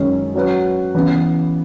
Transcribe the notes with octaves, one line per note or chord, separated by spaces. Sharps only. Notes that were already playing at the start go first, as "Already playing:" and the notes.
Already playing: F#2 D#3 G#3 C#4
F#3 C#4 F#4 B4
C#3 E3 B3